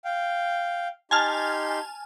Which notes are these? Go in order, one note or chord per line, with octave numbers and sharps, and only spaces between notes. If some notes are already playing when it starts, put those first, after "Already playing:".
F5 G5
D#4 G4 G#5 A5 C6 F6